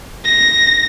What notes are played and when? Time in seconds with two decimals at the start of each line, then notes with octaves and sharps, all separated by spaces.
0.24 A#6